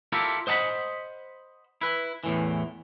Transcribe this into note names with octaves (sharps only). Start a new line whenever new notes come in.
E4 F4 G4 A4 A#4
C5 D#5 F#5 A5 B5
E4 B4
E2 A2 E3